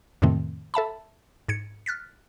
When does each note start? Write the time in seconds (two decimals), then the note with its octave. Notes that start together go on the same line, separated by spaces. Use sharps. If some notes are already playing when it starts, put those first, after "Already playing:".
0.22 F2 A2 C3 D#3 A3 C4
0.74 A4 E5 A5 B5
1.49 G#2 G#6 C#7
1.86 F6 F#6 A6 B6